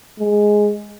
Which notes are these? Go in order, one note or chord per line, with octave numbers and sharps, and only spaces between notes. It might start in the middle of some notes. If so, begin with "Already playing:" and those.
G#3